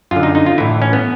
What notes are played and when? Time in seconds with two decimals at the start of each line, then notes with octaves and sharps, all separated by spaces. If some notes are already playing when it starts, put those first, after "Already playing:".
0.11 F#2 D3 F4
0.23 D#4
0.35 D#4
0.46 F4
0.58 A2 E3 E4
0.82 C#4
0.93 B3